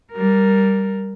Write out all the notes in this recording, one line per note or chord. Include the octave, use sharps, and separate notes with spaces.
G3 A#4